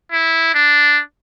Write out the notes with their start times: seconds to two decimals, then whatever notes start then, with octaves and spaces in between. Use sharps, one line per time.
0.12 E4
0.55 D4